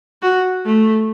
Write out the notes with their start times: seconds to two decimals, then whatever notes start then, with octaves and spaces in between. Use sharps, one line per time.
0.22 F#4
0.65 A3